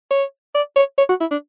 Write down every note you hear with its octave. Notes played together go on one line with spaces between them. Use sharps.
C#5
D5
C#5
C#5
F#4
E4
D4